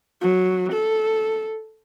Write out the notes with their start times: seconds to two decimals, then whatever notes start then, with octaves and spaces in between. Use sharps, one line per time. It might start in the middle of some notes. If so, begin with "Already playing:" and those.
0.21 F#3
0.73 A4